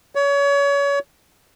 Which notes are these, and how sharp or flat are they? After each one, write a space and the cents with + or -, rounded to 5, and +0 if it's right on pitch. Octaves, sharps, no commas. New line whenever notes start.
C#5 +30